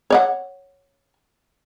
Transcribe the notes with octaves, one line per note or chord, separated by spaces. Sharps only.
C#5 D5 F#5